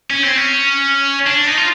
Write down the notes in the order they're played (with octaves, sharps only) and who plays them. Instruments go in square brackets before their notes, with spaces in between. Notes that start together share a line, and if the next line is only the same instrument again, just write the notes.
[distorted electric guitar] C#4
C4
C#4
D4
D#4
F4